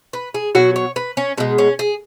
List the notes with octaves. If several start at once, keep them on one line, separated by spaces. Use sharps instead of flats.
B4
G#4
B2 F#3 F#4
C#5
B4
C#4
B2 G#3 D#4
C#4
G#4